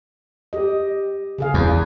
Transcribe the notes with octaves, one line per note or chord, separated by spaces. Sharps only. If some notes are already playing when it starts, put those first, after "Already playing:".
G4 D#5
C#3 G#4 F5
E2